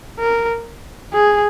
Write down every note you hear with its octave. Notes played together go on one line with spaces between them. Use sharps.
A#4
G#4